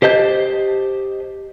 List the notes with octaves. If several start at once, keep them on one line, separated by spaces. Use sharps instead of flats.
G4 C5 D#5 A5 G6